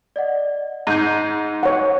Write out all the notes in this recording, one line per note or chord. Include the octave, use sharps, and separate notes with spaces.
D5 D#5 F#5
G#2 G6 D#7
C#5 F#5